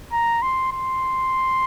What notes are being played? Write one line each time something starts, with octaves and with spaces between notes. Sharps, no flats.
A#5
C6
C6